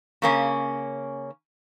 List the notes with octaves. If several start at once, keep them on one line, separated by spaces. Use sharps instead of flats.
C#3 A#3 C#4